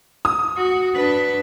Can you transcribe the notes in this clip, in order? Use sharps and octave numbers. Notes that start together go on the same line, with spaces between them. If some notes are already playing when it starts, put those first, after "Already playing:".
D#6
F#4
D4 B4